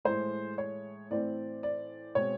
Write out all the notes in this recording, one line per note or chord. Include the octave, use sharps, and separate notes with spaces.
A2 E3 G#3 C5
C#5
A2 E3 A3 C4 D5
D5
B2 G#3 C4 C#5